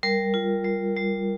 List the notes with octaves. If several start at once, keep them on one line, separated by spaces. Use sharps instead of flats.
G3 A#4
F4
G3
G3